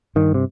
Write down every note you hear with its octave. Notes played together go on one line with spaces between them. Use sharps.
G2 D#3
C3